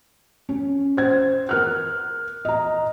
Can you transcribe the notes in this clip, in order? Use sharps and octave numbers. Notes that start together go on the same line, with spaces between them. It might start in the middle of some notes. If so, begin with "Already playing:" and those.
C#4
C5 G#6
A#4 F6 F#6
D#5 A#5